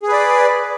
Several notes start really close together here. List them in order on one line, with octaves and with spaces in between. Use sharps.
G#4 B4 D5